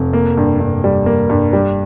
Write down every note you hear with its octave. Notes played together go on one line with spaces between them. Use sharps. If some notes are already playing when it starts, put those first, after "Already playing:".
Already playing: F1
A#3
G2
G2
G3
A#3
G2
G3